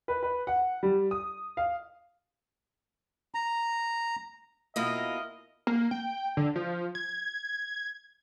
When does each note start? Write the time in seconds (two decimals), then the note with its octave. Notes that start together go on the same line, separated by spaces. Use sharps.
0.08 B4
0.23 B4
0.47 F#5
0.83 G3
1.11 D#6
1.57 F5
3.35 A#5
4.76 B2 A#3 E4 F4 A#4 D#5
5.67 A#3
5.91 G5
6.37 D3
6.56 F3
6.95 G#6